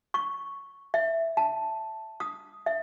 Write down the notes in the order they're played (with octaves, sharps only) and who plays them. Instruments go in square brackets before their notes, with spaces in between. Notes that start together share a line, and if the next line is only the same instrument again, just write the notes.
[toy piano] C#6
E5
A5
D#6
E5